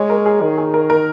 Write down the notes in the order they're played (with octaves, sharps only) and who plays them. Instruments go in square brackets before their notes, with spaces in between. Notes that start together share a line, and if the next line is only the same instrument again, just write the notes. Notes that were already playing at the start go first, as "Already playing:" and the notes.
Already playing: [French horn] G#3 [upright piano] C#5
[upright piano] A#4
G#4
[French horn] D#3 [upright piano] A#4
[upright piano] G#4
A#4
A#4